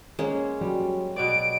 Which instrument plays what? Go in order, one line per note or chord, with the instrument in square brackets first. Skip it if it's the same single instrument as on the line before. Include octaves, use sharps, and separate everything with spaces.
[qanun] G#3 A#3 C#4
[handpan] F#3 [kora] G3
[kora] B2 B3 D5 [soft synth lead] D7